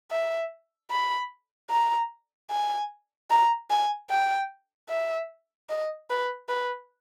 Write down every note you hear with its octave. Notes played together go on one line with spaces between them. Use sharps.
E5
B5
A#5
G#5
A#5
G#5
G5
E5
D#5
B4
B4